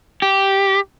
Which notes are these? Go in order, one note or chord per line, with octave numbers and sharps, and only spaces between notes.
G4